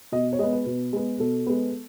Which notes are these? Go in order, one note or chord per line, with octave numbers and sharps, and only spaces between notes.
B2 D#5
C#5
G#3 B3 D#5
B4
B2
G#3 B3
B2 A4
G#3 B3